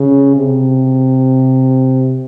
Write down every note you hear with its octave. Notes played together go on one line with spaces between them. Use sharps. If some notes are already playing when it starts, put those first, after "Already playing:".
Already playing: C#3
C3